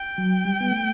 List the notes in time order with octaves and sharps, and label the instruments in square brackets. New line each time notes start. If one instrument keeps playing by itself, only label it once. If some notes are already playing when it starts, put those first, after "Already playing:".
Already playing: [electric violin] G5
[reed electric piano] F#3
G3
B3
A3